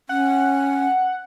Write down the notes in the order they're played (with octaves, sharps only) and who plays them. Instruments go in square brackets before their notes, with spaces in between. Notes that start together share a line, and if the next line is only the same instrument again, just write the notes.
[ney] C#4 [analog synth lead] F#5